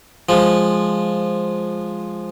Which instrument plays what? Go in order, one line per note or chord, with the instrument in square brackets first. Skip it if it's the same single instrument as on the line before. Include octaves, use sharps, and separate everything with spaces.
[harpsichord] F3 G#3